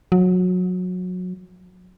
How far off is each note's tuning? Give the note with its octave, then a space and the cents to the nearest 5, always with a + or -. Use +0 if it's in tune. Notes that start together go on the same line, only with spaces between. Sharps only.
F#3 -25